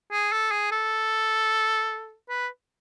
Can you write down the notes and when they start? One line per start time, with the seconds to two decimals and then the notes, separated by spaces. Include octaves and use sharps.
0.12 G#4
0.32 A4
0.51 G#4
0.72 A4
2.29 B4